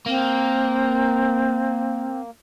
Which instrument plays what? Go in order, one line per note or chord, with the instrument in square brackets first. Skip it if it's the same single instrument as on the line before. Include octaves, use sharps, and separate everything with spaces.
[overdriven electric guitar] A#3 [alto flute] C4